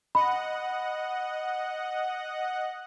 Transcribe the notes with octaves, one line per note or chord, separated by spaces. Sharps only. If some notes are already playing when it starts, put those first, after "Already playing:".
D#5 F#5 B5